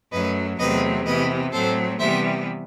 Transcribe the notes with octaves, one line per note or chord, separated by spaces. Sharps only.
F#2 F#3 A3 B4 D#5
E2 C3 F#3 A3 C4 B4 D#5
C3 E3 B3 B4 D#5
A2 F#3 A3 C4 A4 C5
C3 E3 G3 B3 C5 E5